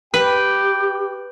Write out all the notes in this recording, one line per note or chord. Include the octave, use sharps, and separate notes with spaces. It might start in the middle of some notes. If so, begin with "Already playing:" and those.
G4 B4 G5